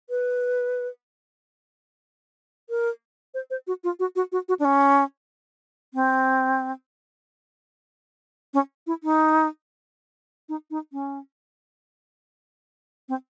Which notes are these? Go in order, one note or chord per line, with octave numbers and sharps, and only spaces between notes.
B4
A#4
C5
C5
F#4
F4
F#4
F#4
F#4
F#4
D4
C#4
C4
C#4
E4
D#4
D#4
D#4
C#4
C4